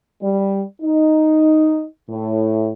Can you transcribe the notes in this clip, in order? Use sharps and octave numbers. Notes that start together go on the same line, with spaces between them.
G3
D#4
A2